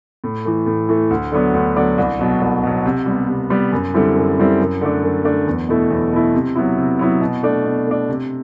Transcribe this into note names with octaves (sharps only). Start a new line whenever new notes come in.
A2
E3 A3
A2
E3 A3
D2
D3 F#3 B3 D4
D2
D3 F#3 B3 D4
C2
B2 F#3
C2
B2 F#3
C3
G3 B3
C3
G3 B3
F#2
D3 G3 C4 E4
F#2
D3 G3 C4 E4
F#2
D3 A3 D4
F#2
D3 A3 D4
E2
B2 A3 E4
E2
B2 A3 E4
C3
F#3 B3 E4
C3
F#3 B3 E4
B2
A3 D4
B2
A3 D4
C3